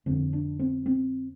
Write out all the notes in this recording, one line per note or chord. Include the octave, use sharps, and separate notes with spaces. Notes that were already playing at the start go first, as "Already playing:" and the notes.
F2 D3 C4
D4
C4
C4